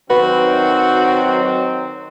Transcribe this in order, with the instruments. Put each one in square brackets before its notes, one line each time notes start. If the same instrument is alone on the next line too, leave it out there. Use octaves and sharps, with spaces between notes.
[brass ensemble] D#3 F#3 C4 [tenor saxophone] F#4 [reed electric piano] B4